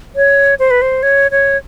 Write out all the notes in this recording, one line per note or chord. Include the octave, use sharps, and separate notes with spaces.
C#5
C5
B4
C5
C#5
C#5